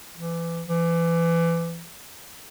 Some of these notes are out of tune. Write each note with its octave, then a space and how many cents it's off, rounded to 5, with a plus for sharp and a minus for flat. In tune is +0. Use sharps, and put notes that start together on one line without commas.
E3 +30
E3 +30